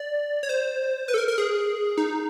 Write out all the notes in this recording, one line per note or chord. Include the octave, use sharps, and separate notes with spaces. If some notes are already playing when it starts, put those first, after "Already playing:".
Already playing: D5
C#5
C5
B4
A4
A#4
A#4
G#4
D#4